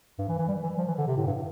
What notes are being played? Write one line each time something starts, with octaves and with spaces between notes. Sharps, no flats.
G2
E3
E3
G3
E3
F3
E3
D3
C3
A2
G2